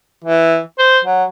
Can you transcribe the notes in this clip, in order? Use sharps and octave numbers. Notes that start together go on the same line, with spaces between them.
E3
C5
F#3